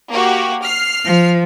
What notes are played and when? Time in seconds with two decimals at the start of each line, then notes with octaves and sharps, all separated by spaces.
0.11 A#3 F#4 G4
0.62 F6 C7
1.05 F3